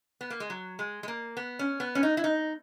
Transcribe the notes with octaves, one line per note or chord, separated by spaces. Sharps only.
B3
A#3
G#3
F#3
G#3
G#3
A#3
B3
C#4
B3
C#4
D#4
E4
D#4